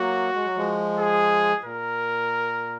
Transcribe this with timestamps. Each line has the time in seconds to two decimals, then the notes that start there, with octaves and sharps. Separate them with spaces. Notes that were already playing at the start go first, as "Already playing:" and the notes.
Already playing: F#3 A#3 F#4
0.35 G#3
0.45 F#3
0.57 F3 G#3
0.99 G#4
1.64 A#2 A#4